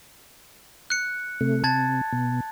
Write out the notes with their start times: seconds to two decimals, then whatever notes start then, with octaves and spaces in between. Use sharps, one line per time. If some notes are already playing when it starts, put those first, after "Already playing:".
0.90 F#6 C#7
1.41 C3 A3
1.64 C3 A5 G#6 A6
2.13 B2